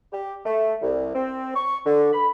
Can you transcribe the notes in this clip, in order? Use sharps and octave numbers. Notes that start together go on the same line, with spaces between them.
G4
A3
C2
C4
C#6
D3
B5